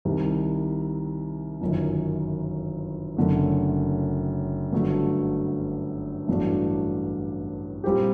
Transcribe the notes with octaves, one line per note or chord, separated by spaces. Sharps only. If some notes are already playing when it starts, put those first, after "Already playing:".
C2 C3 D#3 G3
G1 F#2 D#3
F#1 F#2 D3 A3
G1 G2 D3 F#3 A3
A1 G2 F#3 A3 D4
A#2 G3 C4 G4